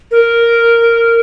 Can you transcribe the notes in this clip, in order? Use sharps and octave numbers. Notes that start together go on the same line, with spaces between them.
A#4